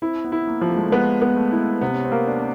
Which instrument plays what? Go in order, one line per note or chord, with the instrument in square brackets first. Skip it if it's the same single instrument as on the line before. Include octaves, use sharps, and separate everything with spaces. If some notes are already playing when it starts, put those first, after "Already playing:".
[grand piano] C4 [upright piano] E4
[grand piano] B3
[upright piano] E4
[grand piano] A#3
[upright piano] F3
[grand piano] A3
G#3
A3
[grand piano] G#3 [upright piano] B3
[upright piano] B3
[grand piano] A3
[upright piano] E4
[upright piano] C3 [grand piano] B3
[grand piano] C#4
C4
[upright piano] A#3
[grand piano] D4
C4